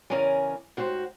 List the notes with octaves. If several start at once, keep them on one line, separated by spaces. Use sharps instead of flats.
E2 C#3 C#4 A#4 D5 G#5
G#2 F#4 G4 C5